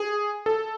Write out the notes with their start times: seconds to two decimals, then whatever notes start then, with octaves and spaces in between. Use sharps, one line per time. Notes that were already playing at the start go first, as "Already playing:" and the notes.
Already playing: G#4
0.46 A4